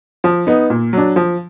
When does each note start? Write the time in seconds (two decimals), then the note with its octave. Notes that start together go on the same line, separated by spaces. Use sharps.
0.24 F3
0.47 B3 D#4
0.70 A#2
0.93 F#3 D4
1.16 F3